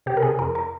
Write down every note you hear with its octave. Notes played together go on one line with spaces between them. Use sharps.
C3 G4
A#4
C3 G#4
F2 A#4
A#4